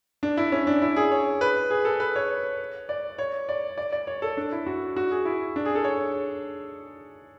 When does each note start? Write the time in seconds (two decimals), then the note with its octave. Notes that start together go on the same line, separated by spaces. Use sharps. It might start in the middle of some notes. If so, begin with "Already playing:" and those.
0.23 D4
0.37 E4
0.52 C#4
0.67 D4
0.82 E4
0.96 G#4
1.11 C#5
1.41 B4
1.70 G#4
1.85 A4
2.00 B4
2.16 C#5
2.89 D5
3.18 C#5
3.49 D5
3.78 D5
3.92 D5
4.07 C#5
4.22 A4
4.37 D4
4.52 E4
4.67 F#4
4.96 F#4
5.11 G#4
5.25 E4
5.56 D4
5.65 G#4
5.75 A4
5.84 C#5